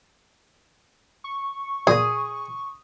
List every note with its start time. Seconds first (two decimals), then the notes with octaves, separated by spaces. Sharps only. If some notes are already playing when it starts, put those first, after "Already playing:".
1.24 C#6
1.87 A#1 A#2 A#3 G#4 D#6